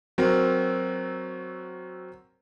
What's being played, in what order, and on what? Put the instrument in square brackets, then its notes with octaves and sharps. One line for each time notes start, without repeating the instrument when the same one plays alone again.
[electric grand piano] F#3 C4 F#4 A#4